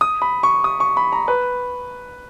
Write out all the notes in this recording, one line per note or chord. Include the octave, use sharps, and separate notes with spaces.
D#6
B5
C#6
D#6
C#6
B5
A#5
B4